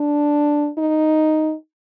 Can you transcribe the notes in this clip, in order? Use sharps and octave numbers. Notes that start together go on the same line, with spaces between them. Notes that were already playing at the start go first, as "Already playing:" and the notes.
Already playing: D4
D#4